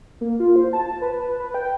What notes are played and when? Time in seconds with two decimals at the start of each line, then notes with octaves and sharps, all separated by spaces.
0.21 A#3
0.40 F4
0.56 C5
0.73 A5
1.01 B4
1.39 B4
1.54 G5